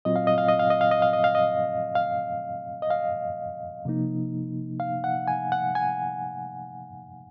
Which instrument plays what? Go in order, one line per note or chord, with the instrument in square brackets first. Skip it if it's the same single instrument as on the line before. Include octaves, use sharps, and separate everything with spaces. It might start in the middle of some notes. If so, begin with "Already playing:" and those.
[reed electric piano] A#2 F#3 C4 F4 D#5
F5
D#5
F5
D#5
F5
D#5
F5
D#5
F5
D#5
F5
D#5
F5
D#5
F5
C3 F3 A#3 D#4
F5
F#5
G#5
F#5
G#5